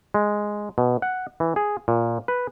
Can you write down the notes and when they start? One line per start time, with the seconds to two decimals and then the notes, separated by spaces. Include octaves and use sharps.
0.14 G#3
0.78 B2
1.02 F#5
1.40 E3
1.56 G#4
1.88 A#2
2.28 B4